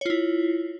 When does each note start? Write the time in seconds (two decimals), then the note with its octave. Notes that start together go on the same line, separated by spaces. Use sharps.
0.01 C#5
0.06 F4
0.10 E4